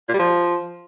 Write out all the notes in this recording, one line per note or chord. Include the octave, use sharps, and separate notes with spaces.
A#2
G3
F3